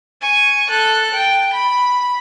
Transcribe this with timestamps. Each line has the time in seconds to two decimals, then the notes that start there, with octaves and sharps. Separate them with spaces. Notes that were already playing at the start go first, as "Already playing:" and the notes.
0.21 G#5 C#6
0.69 A4 F#6
1.14 G5
1.53 B5